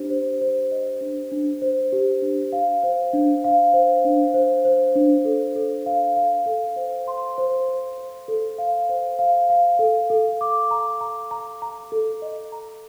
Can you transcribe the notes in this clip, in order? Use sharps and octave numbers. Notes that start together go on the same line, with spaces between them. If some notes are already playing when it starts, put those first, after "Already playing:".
Already playing: D4 G4 C5
C5
C5
D#5
D4
D4
C5
G4
D4
F5
C5
D4
F5
C5
D4
C5
C5
D4
A4
A4
F5
F5
A4
C5
C6
C5
C5
C5
A4
F5
C5
F5
F5
A4
A4
D6
A#5
A#5
A#5
A#5
A4
D#5
A#5